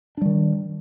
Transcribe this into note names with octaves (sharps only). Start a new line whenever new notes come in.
D#3 G3 D4